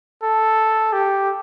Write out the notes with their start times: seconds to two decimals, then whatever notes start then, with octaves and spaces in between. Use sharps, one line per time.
0.23 A4
0.93 G4